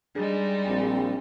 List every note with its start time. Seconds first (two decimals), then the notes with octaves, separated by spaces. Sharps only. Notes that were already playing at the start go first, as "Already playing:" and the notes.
0.15 G3 G#3 D4 D#4 G#4
0.67 A#1 C4